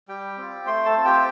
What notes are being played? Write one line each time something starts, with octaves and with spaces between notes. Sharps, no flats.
G3 G4 G5
C4 F4
A3 C5 C6
A4 A5
C4 F4
G4 G5